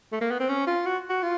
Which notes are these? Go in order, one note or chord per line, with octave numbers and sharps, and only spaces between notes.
A3
A#3
B3
C4
C#4
F4
F#4
F#4
F4